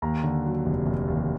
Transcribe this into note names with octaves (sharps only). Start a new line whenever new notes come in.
D#2 A#5
D3
F#3
F1
F1
D#2